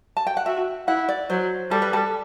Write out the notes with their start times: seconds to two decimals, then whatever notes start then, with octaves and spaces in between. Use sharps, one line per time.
0.17 A5
0.27 G5
0.37 F#5
0.46 F#4 E5
0.88 E4 F#5
1.09 D5
1.30 F#3 C5
1.71 G3 A4
1.82 B4
1.93 A4